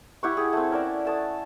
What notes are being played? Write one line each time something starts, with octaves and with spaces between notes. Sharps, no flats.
E4 G4 F#5 C#6
G#4
A3 C4
C#4 A#4 D5 A5
A3 A5 D#6